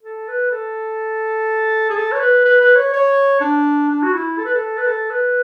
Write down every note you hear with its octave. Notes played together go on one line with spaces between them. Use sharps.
A4
B4
A4
G#4
A4
C#5
B4
B4
B4
C#5
C#5
D4
D4
F#4
E4
A4
B4
A4
B4
A4
B4